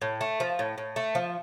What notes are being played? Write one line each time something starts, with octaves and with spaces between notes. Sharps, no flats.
A2
A3
F3
A2
A2
A3
F3